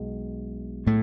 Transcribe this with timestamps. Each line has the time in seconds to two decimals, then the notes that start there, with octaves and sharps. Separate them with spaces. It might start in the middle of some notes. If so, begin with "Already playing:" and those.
Already playing: B1 B2 G#3
0.87 A2 A3